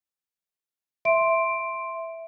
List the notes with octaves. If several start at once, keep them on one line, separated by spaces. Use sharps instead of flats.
E5 C6 D7